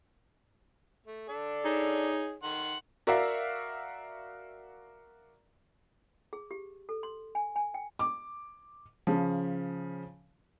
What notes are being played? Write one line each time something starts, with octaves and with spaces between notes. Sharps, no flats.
A3
D4 A4 D5
D#4 G#4 C#5
D#3 F#5 C6
F#4 A#4 D5 E5 F5
G#4
G4
A4
C6
G#5
G#5
G5
D6
C#3 F3